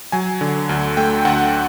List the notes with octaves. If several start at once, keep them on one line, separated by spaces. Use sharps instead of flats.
F#3 G#5
D3
D2
A3 G5
D2 F#5